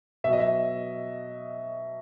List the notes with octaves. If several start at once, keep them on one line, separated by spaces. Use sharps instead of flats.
B2 F#3 D#5 E5
E5